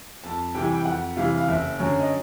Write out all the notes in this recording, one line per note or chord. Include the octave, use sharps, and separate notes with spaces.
F2 A5
C3 E3 G3 G5
G#5
G5
F2 F#5
C3 E3 G3 F5
F5
F#1 E5
F#2 D3 F#3
D#5